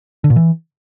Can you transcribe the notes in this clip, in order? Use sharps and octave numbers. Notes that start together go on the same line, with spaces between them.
D3
A#2
E3